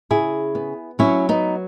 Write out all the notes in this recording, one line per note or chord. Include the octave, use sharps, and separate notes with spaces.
C#3 E4 G#4
B3
F#3 C#4 E4
B3 D#4